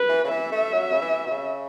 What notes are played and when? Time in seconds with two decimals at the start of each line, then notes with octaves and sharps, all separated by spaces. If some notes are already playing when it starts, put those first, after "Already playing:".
Already playing: B4
0.09 E3
0.24 C#3
0.30 E3 E5
0.52 A3
0.73 F#3
0.93 C#3
1.02 E3
1.26 B2
1.31 C#3